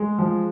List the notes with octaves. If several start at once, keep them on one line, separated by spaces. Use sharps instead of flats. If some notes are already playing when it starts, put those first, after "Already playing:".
Already playing: G#3
F3